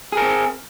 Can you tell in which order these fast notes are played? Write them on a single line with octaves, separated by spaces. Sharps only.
G#4 A#4 C4